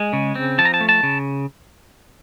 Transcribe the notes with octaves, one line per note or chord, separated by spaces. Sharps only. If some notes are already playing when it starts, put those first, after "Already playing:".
Already playing: G#3 G#5
C#3
C4
F3 A5
A#5
A5
A3
A5
C#3